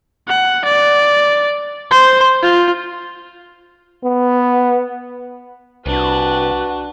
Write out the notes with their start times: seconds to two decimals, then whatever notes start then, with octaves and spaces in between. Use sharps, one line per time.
0.28 F#5
0.65 D5
1.91 C5
2.42 F4
4.04 B3
5.86 C2 D4 F#4 B4